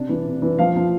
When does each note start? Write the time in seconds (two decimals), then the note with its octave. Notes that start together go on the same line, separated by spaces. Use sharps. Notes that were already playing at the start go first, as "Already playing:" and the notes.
Already playing: C3 D4
0.09 E3
0.26 C3
0.42 E3
0.59 F3 F5
0.76 F3